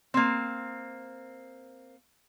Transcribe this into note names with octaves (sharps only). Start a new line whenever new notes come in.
A#3 C4